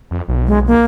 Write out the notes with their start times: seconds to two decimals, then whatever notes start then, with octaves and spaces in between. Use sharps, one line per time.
0.11 F2
0.28 B1
0.47 G#3
0.67 A#3